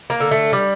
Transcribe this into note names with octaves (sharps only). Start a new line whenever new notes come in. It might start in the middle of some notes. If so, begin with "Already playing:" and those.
A#3
D3
A3
G3